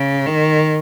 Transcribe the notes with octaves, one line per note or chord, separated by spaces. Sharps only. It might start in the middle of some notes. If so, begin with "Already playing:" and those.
Already playing: C#3
D#3